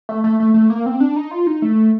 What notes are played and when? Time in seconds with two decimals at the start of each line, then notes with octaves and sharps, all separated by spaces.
0.09 A3
0.24 A3
0.40 A3
0.54 A3
0.70 A#3
0.86 C4
1.00 D4
1.16 D#4
1.31 F4
1.47 D#4
1.62 A3